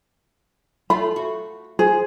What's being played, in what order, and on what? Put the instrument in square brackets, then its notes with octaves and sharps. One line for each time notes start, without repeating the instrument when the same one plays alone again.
[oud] A3 F4 [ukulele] B5
[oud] F#4
[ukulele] G#4 [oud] C5